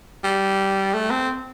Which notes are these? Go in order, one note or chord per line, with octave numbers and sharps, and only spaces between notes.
G3
A3
C4